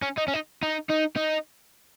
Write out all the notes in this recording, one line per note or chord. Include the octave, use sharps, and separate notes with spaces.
C#4
D#4
C#4
D#4
D#4
D#4
D#4